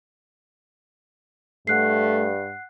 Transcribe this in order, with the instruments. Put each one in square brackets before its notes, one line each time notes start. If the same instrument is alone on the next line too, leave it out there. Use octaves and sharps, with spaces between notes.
[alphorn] G2 [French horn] A3 [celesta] F#5 F#6 C7